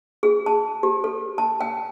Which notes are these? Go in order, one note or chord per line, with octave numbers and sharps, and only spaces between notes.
G#4
A5
G4
A4
A5
G5